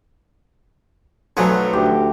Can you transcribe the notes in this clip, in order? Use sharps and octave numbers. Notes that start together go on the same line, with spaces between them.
B1 F3 F#3 A3 F#5 G#5
D2 G4